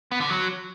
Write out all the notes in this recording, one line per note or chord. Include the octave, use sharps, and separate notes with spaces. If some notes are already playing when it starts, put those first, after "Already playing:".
B3
D3
F#3